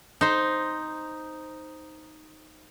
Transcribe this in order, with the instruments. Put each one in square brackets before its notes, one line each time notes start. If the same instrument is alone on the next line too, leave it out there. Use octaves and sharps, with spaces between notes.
[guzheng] D#4 C5